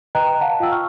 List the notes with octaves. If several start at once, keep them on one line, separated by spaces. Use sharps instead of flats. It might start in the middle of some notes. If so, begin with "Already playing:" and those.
B4 D#5 G5 A#5 F#6
F5 F#5 A5
F4 F5 G5 E6
C#6 F6